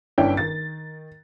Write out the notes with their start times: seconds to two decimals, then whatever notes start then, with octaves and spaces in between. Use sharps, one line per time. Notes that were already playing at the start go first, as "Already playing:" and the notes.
0.18 G1 C#4 D4 E4 G5
0.37 D#3 A6